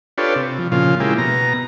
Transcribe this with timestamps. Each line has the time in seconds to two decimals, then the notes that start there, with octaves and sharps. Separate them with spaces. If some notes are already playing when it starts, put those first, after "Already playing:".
0.18 D4 F4 G4 A4 B4 C#5
0.36 C3
0.59 F3
0.72 A#2 C#3 F3 F4
1.00 C#3 G#3 A#3 E4 G4
1.18 B2 A#5